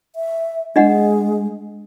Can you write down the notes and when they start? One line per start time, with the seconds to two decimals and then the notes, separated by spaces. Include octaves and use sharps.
0.16 E5
0.76 G#3 D4 D#5 F#5